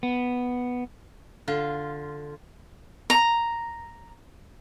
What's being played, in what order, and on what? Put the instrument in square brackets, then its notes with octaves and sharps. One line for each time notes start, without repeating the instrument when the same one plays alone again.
[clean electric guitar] B3
[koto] D3 F4
[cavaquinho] A#5